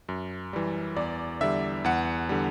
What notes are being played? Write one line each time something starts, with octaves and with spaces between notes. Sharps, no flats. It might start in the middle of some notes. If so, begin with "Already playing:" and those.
F#2
E3 G3
E2 D5
D3 G3 E5
E2 F#5
D3 G3